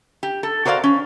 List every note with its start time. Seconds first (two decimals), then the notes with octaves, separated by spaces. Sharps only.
0.23 G4
0.43 A4
0.65 F#4 A#4 C5 D5 F5
0.84 C#4